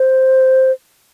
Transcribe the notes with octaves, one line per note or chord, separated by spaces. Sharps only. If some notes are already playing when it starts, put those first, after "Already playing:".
Already playing: C5